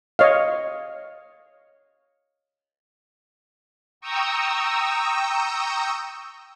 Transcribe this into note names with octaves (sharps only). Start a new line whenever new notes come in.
C#5 D#5 F5
G5 A#5 C#6 D#6 E6